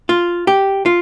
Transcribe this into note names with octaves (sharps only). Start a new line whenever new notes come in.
F4
G4
F4